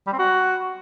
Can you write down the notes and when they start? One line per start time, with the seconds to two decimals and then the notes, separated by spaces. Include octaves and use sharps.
0.07 G3
0.13 C4
0.19 F#4